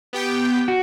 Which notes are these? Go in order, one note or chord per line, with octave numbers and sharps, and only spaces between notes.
B3 G4 G5
F#4